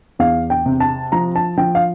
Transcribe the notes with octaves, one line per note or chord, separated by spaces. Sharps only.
E2 F5
G5
C3
A5
F3 A#5
A5
F3 G5
F5